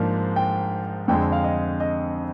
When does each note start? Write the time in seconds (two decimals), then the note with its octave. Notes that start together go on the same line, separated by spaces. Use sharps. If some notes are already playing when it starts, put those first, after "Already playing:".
Already playing: G#2 F3 A#3 D4
0.36 G5
1.08 F2 D3 G#3 G5
1.32 F5
1.44 D#5
1.80 D#5